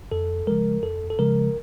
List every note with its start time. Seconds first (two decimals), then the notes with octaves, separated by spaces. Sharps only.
0.11 F2 A4
0.47 C#3 F3 G#3 A#4
0.83 F2 A4
1.10 A4
1.19 C#3 F3 G#3 A#4